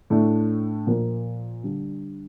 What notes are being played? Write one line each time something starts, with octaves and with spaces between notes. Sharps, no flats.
A2 A3 D4
A#2 F3 A#3
D3 G3 D4